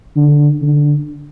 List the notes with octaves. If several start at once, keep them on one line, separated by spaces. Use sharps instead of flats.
D3
D3